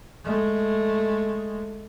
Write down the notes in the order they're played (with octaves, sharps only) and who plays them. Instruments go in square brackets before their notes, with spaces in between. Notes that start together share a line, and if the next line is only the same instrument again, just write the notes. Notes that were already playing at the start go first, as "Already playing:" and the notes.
[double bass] G#3 A3